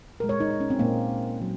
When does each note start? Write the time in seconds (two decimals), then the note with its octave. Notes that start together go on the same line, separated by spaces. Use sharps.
0.20 A#2 A#4
0.24 G#3
0.29 C#5
0.40 D#4
0.50 D#4
0.60 C#4
0.70 C4
0.79 A#2 G#3 A#3
1.41 F#3 A#3